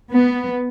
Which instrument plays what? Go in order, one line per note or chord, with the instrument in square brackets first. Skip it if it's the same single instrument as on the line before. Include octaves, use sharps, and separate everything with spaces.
[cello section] B3